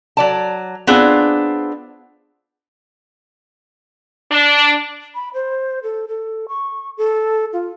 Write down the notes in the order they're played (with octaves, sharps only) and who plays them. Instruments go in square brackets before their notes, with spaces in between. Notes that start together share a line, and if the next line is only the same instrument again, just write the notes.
[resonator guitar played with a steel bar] F#3 D5 A5
B3 C4 D4 F4 G#4
[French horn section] D4
[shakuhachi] B5
C5
A4
A4
C#6
A4
F4